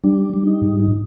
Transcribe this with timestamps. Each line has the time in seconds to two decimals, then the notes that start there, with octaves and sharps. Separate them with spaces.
0.04 G3 D4
0.34 G3
0.47 D#4
0.62 G#2
0.80 D#4